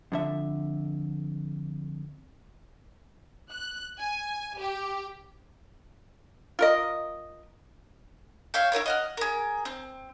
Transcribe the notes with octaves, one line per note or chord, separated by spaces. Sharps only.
F2 D3 E5
F#6
G#5
G4
F4 A#4 D#5
C#5 E5 F5 G5
E4 F4 A#4 C#5
D#5 F#5 F6
G#4 A#4
C4